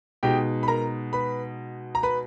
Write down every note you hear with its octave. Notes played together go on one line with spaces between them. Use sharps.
B2 G#3 D#4 G4 G5
B5
A#4 A#5
B4 B5
A#5
B4 B5